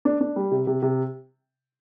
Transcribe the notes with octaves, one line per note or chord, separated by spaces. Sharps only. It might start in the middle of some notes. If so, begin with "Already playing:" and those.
D4
D4
G3
C3
C3
C3